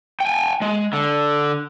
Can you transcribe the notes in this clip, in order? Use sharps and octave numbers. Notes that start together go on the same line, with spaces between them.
G5 G#5
G#3
D3